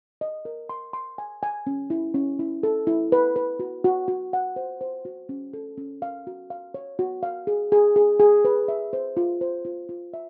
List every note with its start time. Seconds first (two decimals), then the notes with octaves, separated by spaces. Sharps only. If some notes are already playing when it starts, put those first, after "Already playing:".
0.21 D#5
0.45 A#4
0.69 C6
0.93 C6
1.18 G#5
1.43 G#5
1.67 C#4
1.90 E4
2.14 C#4
2.39 E4
2.63 A4
2.87 E4
3.12 B4
3.36 B4
3.60 F#4
3.84 F#4
4.08 F#4
4.33 F#5
4.56 C5
4.81 C5
5.05 F#4
5.29 C#4
5.53 A4
5.77 C#4
6.02 F5
6.27 F#4
6.50 F5
6.74 C#5
6.99 F#4
7.23 F5
7.47 G#4
7.72 G#4
7.96 G#4
8.20 G#4
8.45 B4
8.68 E5
8.93 C5
9.17 F4
9.41 C5
9.65 F4
9.89 F4
10.14 E5